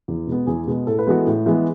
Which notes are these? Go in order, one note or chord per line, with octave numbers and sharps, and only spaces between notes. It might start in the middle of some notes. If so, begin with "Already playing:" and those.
E2
B2 G#3 B3
E2 G#4
B2 G#3 B3
A2 A4
B4
E3 G#3 B3 F#4 A4
A2
E3 G#3 B3